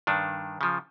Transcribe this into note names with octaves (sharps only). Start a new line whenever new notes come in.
G2 D#3 D4
C#3 F3